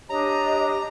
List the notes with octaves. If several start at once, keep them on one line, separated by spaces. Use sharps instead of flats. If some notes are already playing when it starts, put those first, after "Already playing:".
D4 G4 C#5 D#5 A#5